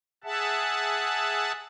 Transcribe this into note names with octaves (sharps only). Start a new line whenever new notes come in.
G#4 E5 F#5 A5